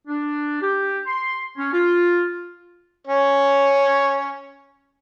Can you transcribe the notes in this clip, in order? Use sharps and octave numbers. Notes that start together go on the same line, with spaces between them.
D4
G4
C6
C#4
F4
C#4 C#5